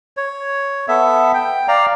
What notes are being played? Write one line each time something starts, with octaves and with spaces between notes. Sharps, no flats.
C#5
B3 A4 E5
G5
D5 F5 A#5